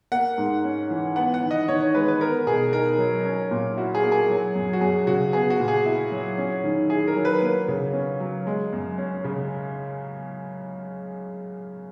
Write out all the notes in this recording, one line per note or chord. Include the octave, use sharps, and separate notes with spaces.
A#3 F#5
G#2
C#4
E3
B3 F#5
F#5
D#3
D#5
D#3 C#5
C#5
G#3 B4
B4
B3 A#4
B2 G#4
D#4 A#4
F#3
C#4
A#2
E4 F#4
G#4
A#3
G#4
F#3
F#2
F#4
F#2 G#4
C#3 F#4
B3 G#4
F#4
A#2
G#4
E4
F#3
C#4
D#3
E4 G#4
A#4
F#3
B4
A#3
C#3
C#4
F#3
G#3
F#2
C#4
C#3